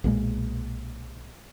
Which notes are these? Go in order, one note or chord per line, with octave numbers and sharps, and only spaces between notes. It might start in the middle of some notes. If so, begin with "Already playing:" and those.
B1 A#2 G3 G#3